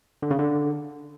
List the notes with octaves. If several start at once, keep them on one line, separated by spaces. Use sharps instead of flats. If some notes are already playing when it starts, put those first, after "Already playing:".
D3
C#3
D3